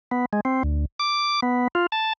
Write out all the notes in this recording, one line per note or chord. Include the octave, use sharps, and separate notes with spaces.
B3
G#3
C4
D2
D6
B3
F4
A5